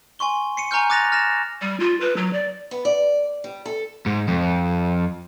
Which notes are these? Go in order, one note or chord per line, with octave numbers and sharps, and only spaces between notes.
G#5 C6 C#6 G7
C7 C#7 D#7
G#5 A#5 C#6 F6 G6
D6 F#6 A6 A#6 D#7 F7
F6 A6 A#6 E7
G3
F4
B4
F#3
D5
B3
D5
G3
A4
G#2
F2